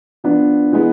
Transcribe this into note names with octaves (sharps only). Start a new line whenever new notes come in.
F3 B3 D4
E3 G#3 B3